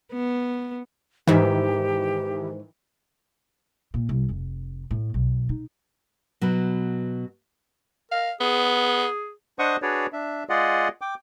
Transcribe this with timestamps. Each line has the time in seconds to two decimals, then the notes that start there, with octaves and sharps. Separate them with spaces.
0.13 B3
1.28 G#2 D#3 E3 G4 E5
3.94 A#2
4.09 C2
4.29 F1
4.91 A2
5.14 B1
5.49 D#4
6.41 B2 F#3
8.11 A#4 F5
8.41 B3 G#4
9.59 D4 C5 D#5 F#5 C#6 D#6
9.82 D4 F#4 G#4 B4 C#5 D5
10.13 D4 E5
10.49 G#3 F4 G#4 D5 D#5 F#5
11.01 G5 D6